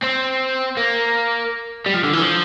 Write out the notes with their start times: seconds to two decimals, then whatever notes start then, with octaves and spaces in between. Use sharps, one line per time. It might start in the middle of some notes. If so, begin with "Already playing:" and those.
0.03 C4
0.77 A#3
1.86 G3
1.94 F3
2.04 D3
2.13 E3
2.22 F3